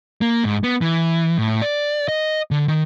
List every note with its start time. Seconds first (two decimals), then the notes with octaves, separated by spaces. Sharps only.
0.21 A#3
0.45 G#2
0.64 B3
0.81 E3
1.38 A2
1.62 D5
2.08 D#5
2.51 D3
2.68 D#3